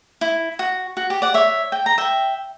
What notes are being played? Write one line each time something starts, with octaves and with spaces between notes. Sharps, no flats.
E4
F#4
F#4
G4
D5 F#5
C#5 E5
G5
A#5
E5 G5